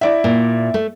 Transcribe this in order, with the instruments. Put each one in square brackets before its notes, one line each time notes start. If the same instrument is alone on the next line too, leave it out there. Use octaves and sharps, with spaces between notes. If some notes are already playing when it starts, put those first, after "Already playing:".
[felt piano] E4 D5 E5
[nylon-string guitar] A#2
A3